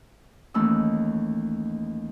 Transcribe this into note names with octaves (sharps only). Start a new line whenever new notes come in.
D#2 E3 A3 C#4 E6